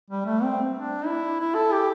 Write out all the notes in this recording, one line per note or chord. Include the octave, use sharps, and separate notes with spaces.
G3
A3
C4
D4
E4
E4
A4
G4